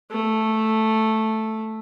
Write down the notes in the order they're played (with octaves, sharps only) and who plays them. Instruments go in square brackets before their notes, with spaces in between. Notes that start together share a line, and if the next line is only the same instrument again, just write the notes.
[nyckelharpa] A3